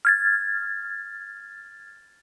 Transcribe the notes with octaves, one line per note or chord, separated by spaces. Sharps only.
F6 G#6 A6